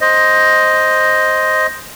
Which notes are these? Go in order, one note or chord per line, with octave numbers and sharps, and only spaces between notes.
C5 D#5